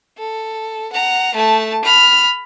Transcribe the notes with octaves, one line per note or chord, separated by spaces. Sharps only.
A4
F#5 A#5
A3 A5
B5 F6